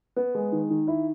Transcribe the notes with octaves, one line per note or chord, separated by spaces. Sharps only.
B3
G#3
D#3
D#3
E4